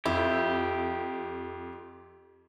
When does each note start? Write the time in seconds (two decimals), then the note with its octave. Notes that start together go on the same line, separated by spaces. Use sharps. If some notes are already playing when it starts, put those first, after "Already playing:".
0.06 F2 E4 G4